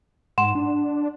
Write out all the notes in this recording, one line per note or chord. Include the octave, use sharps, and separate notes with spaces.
G#2 F#5 C6 E7
D4